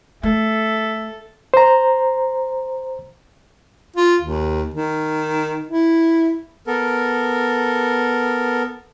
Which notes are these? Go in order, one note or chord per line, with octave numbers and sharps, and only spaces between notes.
A3 A4 E5
C5 A#5
F4
D#2
D#3
E4
B3 A4 A#4